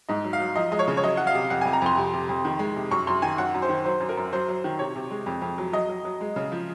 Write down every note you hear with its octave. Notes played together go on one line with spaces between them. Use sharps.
G#2 D#5
F#3
F5
F#3
F3 D#5
G#3 D#5
C#5
C#3
C#5
F#3 D#5
F#3 F#5
F5
C3
F2 F#5
F2 G#5
A#5
F2 C6
C3
C3
F2
D#3
G#3
C3
F#2 C#6
F#2 C6
D#3 G#5
F#2 F#5
F#2
C5
D#3
F#3 C5
F#2
A#4
F#2
F#3 C5
F#3
D#3
C3 C#5
C3
G#3
F2
F2
F#3
F#3 D#5
F#3
F#3
G#3
C#3
F3